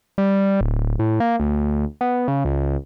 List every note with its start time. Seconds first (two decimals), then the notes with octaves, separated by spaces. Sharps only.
0.18 G3
0.61 D1
0.99 A2
1.20 A#3
1.40 D2
2.01 B3
2.28 C#3
2.45 C#2